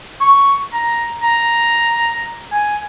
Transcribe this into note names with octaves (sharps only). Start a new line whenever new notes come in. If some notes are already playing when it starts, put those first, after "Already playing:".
C#6
A#5
A#5
G#5